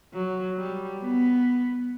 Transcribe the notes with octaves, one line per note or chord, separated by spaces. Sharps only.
F#3
G3
B3